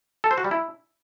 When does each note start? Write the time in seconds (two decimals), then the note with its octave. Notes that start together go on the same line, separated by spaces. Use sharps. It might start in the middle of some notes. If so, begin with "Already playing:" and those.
0.24 A4
0.31 C5
0.38 F#4
0.44 G3
0.51 E4